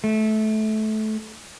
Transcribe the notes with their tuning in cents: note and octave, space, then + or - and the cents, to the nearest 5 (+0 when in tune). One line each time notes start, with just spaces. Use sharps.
A3 -20